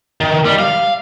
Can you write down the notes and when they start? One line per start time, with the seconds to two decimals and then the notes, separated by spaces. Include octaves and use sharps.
0.21 D#3
0.45 G3
0.59 F5